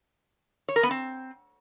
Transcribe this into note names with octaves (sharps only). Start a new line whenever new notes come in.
C#5
A#4
B3
C4